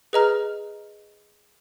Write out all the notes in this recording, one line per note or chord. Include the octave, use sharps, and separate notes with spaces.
G#4 B4 D#5 A#5 F6